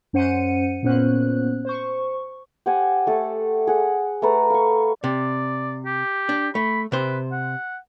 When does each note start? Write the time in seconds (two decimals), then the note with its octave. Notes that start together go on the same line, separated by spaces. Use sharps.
0.13 F#2 C#4 C5 F#5 C#7 D#7
0.83 A#2 B3 C#4 C5 F#6
1.65 C5 C#6
2.66 G4 C5 F#5 G#5
3.07 A3 A4
3.67 G#4 F#5
4.22 A3 A4 B4 A#5
4.50 F5 C#6
5.04 C3 D5
5.86 G4
6.29 D4
6.55 A3 B5
6.92 C3 B4 C5
7.32 F#5